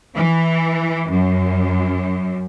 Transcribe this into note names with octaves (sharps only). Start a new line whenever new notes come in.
E3
F#2